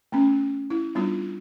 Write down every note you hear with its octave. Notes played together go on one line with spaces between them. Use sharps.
A3 B3 C#4
E4
G3 B3 D4 F4